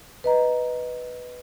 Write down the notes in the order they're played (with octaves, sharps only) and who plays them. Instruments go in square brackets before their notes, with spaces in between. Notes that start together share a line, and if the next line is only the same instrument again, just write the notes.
[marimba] B4 D#5 A#5